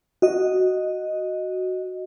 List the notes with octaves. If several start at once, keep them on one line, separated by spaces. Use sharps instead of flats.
F#4 D#5